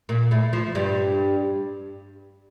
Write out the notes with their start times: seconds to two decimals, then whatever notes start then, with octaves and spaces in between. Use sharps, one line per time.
0.09 A#2 A#3
0.31 A2 A3
0.53 F3
0.75 G2 G3